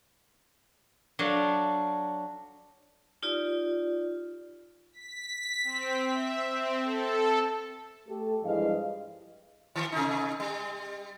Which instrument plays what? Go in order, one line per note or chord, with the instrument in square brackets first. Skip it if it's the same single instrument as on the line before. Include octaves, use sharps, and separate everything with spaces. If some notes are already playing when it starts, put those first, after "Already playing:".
[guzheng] F#3 D4 A4 F5
[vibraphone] D#4 F4 G4 D5
[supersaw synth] B6
C4
E5
C4
A4
[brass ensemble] A3 G4 A4
G2 E3 F3 G#3 D#5 F5
[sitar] D#3
C3 D#4
G3